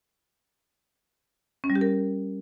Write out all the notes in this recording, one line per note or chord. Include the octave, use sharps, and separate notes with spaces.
C#4
G3
G4
A#4